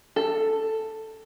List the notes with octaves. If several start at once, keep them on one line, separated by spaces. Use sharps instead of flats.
A4